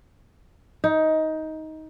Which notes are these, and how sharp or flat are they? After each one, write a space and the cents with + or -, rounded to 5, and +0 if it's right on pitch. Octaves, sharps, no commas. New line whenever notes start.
D#4 +15